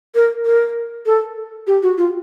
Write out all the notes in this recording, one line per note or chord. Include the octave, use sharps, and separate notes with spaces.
A#4
A#4
A4
G4
F#4
F4